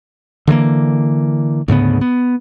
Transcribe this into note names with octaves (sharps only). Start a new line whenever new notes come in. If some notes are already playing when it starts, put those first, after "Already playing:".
D3 E3 G3 A#3
D2 G#2 C#3 B3
B3